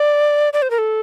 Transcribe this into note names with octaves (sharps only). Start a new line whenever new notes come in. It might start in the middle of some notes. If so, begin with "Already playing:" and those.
Already playing: D5
D5
C5
A#4
A4